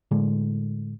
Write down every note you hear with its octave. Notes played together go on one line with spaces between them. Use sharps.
A2 D3 G#3